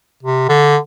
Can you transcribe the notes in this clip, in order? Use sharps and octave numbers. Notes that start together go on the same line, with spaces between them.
C3
D3